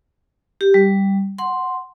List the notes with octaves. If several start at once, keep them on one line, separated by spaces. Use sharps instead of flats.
G4
G3
F#5 C6